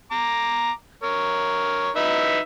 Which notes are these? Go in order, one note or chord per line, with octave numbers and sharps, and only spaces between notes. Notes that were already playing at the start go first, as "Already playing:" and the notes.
A#5 D6
A#4 C#5
D#4 B4 E5